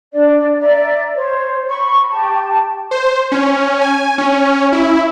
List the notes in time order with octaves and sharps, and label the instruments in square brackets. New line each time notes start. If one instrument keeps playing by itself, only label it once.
[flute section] D4 D5
D5 E5 A#5
C5 C#5
B5 C#6
G4 A5
[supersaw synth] C5
C#4
G#5
C#4
E4